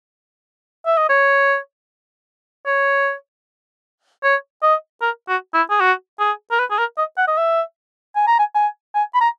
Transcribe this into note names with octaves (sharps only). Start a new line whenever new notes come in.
E5
D#5
C#5
C#5
C#5
D#5
A#4
F#4
E4
G#4
F#4
G#4
A#4
B4
G#4
A#4
D#5
F#5
D#5
E5
G#5
A#5
G#5
G#5
G#5
B5
A#5